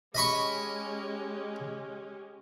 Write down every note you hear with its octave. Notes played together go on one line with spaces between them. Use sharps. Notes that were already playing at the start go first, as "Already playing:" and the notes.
G#3 C#4 G4 D#5 B5 C#6